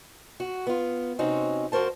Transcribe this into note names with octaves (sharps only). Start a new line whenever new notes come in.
F#4
B3 F4
C3 C4 C#4 D#4 F#4
F2 F#4 A#4 C5 A5